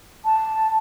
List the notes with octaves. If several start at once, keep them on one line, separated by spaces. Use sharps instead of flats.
A5